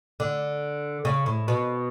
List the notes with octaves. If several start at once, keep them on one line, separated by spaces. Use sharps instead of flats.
D3
C#3
A2
B2